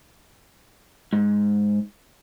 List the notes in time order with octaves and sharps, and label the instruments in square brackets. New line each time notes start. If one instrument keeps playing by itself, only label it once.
[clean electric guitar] G#2